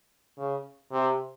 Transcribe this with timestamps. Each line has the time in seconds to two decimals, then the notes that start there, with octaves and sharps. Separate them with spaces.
0.38 C#3
0.91 C3